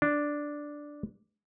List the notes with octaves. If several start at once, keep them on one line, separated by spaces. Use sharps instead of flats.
D4